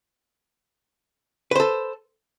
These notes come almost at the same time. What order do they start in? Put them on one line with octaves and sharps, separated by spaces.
B4 C5 A4